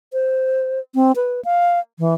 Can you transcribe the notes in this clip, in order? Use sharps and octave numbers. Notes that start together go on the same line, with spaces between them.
C5
C4
B4
F5
E3